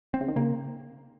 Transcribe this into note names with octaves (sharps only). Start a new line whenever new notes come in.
C4
C#3
D#3
C#3 A#3